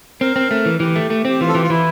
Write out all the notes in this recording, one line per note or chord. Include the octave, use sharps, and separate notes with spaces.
C4 A#4
C4
A3
E3
E3 G4
A3
A3
C4 G4
E3 F4
A4
E3 G4
F4
E3 E4